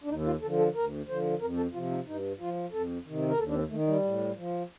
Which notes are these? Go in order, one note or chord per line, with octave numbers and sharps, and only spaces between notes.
D4
D#2 D#4
F4
D3 F3 A4
A4
D2 A#4
D3 F3 C5
F2 A#4
A4
C3 F3 F4
D#4
G2 D#4
F3 F4
F2 A4
C3 D#3
A#4
D#2 A4
D4
C4
D#3 A3
G3
A2
F3